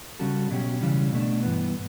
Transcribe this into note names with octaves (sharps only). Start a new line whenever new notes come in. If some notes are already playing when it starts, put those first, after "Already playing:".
C#3 G3 C#4 F#4 A4
B2 F#3 C#4 G4
C#3 E3 G3 C#4
B2 A3 D4
G2 E3 B3